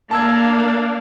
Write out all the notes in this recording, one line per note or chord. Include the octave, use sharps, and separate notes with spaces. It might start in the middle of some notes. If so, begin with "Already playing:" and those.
A#3 D4 F5 A5 E6 G#6